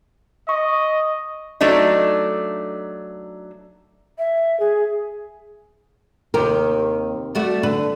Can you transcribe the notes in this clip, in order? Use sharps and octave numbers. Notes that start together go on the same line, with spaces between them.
D#5 C#6
F#3 A3 D4 D#4
E5
G#4
D#2 C3 D#3 G4 A#4
G3 A3 F#4
D3 A4 B4